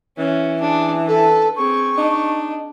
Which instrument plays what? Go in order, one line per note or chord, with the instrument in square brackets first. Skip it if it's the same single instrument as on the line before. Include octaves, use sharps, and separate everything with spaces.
[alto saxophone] E3 [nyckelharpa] C#4
[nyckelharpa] D4 [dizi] G#4
[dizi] A4 [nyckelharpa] B4
[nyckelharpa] C4 G#4 [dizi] C#6
[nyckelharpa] D4 [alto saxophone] D#4